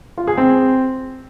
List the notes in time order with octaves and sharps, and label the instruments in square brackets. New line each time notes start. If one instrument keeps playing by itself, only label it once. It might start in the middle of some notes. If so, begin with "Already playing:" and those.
[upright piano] F4
G#4
C4